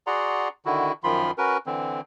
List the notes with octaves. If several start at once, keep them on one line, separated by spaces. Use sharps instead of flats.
F#4 G#4 D5 F#5 A#5 C6
D3 D#3 E4 F#4
F#2 D#3 F3 F4 B5 C6
C#4 F#4 A#4 B4
D3 E3 C4